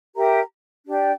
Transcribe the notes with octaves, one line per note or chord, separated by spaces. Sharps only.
G4 A#4 E5 A#5
D4 G4 D5 G5